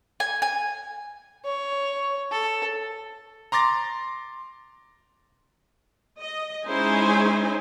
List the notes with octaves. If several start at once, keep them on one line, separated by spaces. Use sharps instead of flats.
G#5
G#5
C#5
A4
A#5 C6 D6 A6 A#6
D#5
G#3 C#4 D#4 E4 C5 G#5